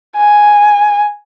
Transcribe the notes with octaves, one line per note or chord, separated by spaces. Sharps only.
G#5